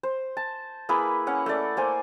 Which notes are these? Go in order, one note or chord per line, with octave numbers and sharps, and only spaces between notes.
C5
A5
A#3 E4 G#4 B4
C#4 F#5
A3 D5
A#3 C5 G#5